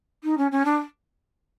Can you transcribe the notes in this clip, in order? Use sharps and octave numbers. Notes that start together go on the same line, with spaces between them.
D#4
C#4
C#4
D4